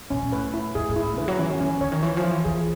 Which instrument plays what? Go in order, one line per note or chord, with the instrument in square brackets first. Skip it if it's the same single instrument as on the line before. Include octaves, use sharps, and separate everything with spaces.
[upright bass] A#2 [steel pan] C#4
[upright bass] A#2
[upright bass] A2 [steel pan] B4
[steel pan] E4
[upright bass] A2 [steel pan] G#4
[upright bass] A2
[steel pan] E4
[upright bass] G#2
[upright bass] D3 [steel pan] B4
[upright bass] F#3
[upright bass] E3 [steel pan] C#4
[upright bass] D#3
[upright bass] D#3 [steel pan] C#4
[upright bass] D3 [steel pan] C#5
[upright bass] D#3
[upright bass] E3 [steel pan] F4
[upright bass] F3
[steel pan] F4
[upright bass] E3
[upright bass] E3 [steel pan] G#4